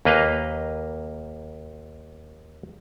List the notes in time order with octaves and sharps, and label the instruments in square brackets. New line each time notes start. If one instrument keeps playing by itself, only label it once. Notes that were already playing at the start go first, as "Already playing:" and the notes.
[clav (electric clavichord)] D#2 A#3 B4 D#5 F5